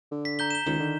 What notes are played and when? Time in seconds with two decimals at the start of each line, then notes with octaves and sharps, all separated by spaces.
0.11 D3
0.25 B6
0.39 A#5 G6 G7
0.51 E7 G7
0.66 C#2 D#3
0.80 D3